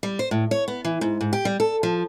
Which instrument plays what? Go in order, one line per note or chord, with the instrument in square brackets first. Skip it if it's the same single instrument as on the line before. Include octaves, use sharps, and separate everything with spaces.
[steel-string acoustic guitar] G3
C5
A2
C#5
B3
E3
G#2
G#2
G4
G3
A4
F3